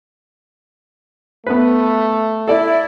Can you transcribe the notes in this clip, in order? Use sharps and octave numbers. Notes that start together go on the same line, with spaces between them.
A3 B3 B4
E4 A4 D5